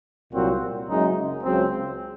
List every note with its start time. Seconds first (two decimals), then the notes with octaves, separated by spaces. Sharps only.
0.32 C2 A#2 F#3 C4 F#4
0.87 F#1 F#2 C#3 G#3 D#4
1.44 C#2 C#3 F#3 C4